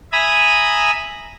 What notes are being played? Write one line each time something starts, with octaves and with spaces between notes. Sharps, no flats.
E5 G#5 A#5 B5 D#6